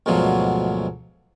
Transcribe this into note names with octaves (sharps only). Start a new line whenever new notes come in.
D2 G#2 B2 F3 F#3